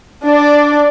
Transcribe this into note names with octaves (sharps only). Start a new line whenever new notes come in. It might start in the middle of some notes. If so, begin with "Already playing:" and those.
D4 D5